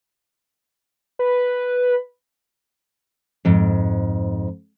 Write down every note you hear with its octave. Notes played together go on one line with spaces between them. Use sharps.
B4
F2 G#2